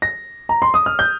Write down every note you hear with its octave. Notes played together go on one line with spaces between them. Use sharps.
A#6
A#5
C6
D#6
F6
G6